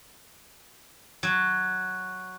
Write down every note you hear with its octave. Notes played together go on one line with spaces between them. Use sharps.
F#3